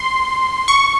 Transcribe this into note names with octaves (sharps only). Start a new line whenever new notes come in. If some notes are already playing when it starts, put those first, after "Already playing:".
Already playing: C6
C#6